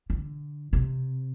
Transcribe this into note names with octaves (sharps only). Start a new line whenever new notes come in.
D3
C3